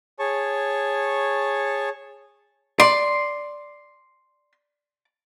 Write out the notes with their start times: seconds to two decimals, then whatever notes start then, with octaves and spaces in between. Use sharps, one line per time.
0.19 G#4 C#5 A5 C#6
2.80 D5 C6